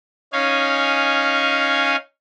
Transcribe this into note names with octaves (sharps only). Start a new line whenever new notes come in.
C#4 D#4 C#5 F5 G#5